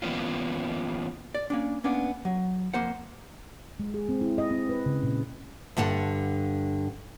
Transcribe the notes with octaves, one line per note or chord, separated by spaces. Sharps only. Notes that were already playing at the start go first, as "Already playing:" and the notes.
E3 A#3 B3 C#4 F4
D5
A#3 C#4 D4
A#3 B3 C#4 D4
F#3
F2 A#3 C5 F#5
G#3
G#4
C4
E4
D#5
C4
B4
C#3
A#2
G2 D3 F#5 A5